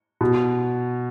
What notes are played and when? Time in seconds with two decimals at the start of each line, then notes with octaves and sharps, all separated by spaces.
0.21 B2